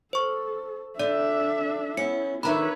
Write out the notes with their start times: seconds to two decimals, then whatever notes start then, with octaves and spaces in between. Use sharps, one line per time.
0.13 A4 C5 C#6
0.99 D3 D4 D5 E5
1.97 B3 C#4 E4 C#7
2.43 D3 D#3 B4 C#5 E5 A#5 B5